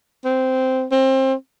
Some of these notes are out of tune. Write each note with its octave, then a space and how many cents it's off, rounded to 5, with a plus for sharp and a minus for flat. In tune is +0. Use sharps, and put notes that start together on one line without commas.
C4 -10
C4 +25